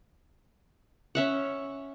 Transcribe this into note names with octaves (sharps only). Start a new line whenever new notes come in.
C#4 E5 F#5